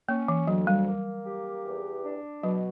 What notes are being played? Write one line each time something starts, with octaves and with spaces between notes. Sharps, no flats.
A#3 C#4
E3
D2 F#3
G3
A#3
G4
E2
D4
B2 F#3